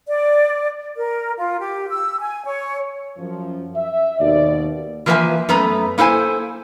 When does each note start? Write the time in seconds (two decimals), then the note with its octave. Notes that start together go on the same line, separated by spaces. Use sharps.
0.07 D5
0.96 A#4
1.37 F4
1.59 G4
1.89 E6
2.20 G#5
2.46 C#5
3.18 F#2 F3
3.75 E5
4.19 D#2 B2 D5
5.06 E3 F3 A#3 B4 E5 G#5
5.49 F#2 A3 B3 B4 A#5
5.98 A#3 E4 A4 C5 G#5